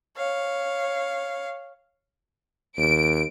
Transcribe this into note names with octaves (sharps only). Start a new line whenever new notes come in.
C#5 F5
D#2 D7